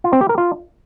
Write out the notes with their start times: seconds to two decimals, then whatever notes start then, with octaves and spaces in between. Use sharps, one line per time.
0.04 F4
0.13 C4
0.21 G4
0.29 A#4
0.38 F4